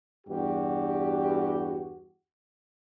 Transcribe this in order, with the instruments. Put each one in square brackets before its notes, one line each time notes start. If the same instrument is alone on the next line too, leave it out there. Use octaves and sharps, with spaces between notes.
[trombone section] E2 G2 F#4 G4